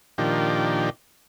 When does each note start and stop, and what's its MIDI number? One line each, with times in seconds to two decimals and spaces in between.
0.18 0.90 46
0.18 0.90 51
0.18 0.90 53
0.18 0.90 62
0.18 0.90 67